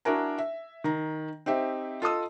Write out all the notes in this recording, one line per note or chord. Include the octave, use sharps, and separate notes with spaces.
D4 E4 F#4 A#4 G#5 A#5
E5
D#3 A#5
C4 D#4 G4 E5
F4 A4 D#5 D#6 E6